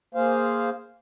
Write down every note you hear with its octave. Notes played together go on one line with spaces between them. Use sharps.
A#3 G#4 C5 F5